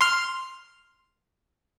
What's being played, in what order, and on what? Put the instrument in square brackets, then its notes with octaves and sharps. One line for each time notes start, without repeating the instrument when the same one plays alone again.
[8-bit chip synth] C6 F6